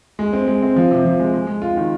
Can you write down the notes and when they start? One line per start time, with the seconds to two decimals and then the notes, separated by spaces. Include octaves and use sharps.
0.19 G#3
0.33 C4
0.47 G#3
0.62 C4
0.76 F3
0.91 C3
1.05 F3
1.20 G#3
1.34 G#3
1.47 G#3
1.62 F4
1.77 D#3